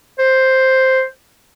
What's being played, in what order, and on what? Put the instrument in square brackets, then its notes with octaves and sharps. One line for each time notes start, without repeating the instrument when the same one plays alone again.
[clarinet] C5